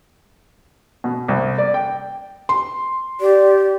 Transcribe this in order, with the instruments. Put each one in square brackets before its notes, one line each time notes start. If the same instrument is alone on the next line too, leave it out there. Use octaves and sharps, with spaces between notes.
[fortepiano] B2
C2
D5
G5
[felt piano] C6
[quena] G4 [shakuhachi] D5